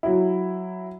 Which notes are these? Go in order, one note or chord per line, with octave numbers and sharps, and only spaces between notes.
F#3 E4